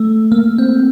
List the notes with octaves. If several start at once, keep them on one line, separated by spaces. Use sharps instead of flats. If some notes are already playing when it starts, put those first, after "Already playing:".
Already playing: A3
A#3
C4